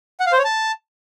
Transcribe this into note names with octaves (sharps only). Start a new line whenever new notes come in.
F#5
F5
C5
C#5
A5